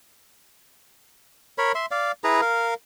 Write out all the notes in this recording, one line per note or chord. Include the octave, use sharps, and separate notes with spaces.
A#4 C#5 B5
E5 C6
D5 F5
E4 G#4 B4 A#5
A#4 F5